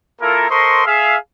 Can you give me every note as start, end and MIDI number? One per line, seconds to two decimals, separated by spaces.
0.21 0.45 58
0.21 0.45 64
0.21 0.45 65
0.21 0.45 69
0.21 0.45 70
0.50 0.82 69
0.50 0.82 70
0.50 0.82 72
0.50 0.82 75
0.50 0.82 84
0.50 0.82 85
0.86 1.16 68
0.86 1.16 76
0.86 1.16 77